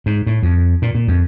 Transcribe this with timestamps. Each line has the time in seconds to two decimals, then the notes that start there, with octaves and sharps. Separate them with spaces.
0.06 G#2
0.27 A2
0.43 F2
0.82 A#2
0.95 A#2
1.08 F2